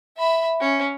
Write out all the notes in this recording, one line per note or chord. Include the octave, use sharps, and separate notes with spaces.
E5 B5
C#4